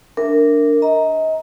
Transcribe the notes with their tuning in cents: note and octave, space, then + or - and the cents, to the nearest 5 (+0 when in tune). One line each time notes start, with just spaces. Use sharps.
D4 -5 A#4 -15 E5 +0
D#5 +35 A#5 +0